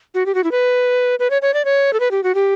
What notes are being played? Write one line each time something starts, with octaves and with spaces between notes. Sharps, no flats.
F#4
G4
F#4
E4
B4
B4
C#5
C#5
D5
C#5
A4
B4
G4
F#4
G4